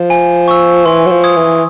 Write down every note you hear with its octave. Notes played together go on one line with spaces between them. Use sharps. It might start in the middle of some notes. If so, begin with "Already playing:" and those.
Already playing: F3
G#5
C#6 E6
E3 C6
F#3
F3
D#6 G#6
E3